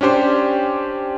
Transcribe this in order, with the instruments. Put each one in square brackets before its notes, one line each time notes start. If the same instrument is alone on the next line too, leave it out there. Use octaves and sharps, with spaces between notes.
[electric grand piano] C#4 D4 G4 C5